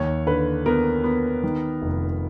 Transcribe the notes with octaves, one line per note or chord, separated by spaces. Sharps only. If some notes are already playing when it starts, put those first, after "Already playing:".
Already playing: D#2 C#5
D3 B4
B3 A#4
B3
D#3
F1